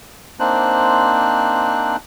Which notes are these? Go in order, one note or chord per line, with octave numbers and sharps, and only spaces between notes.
A#3 C4 D4 D#4 C5 F#6